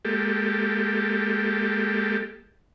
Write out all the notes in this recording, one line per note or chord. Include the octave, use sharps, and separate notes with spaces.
G#3 A#3 G4 A4